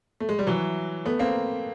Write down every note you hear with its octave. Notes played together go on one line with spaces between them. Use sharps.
A3
G#3
G3
E3 F#3
A3 B3
A#3 C4